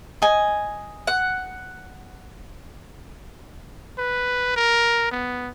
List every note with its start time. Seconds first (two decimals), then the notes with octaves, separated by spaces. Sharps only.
0.22 D#5 G#5
1.07 F#5
3.98 B4
4.56 A#4
5.12 B3